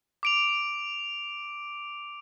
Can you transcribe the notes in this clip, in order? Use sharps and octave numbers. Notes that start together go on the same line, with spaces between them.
D6 D7 F7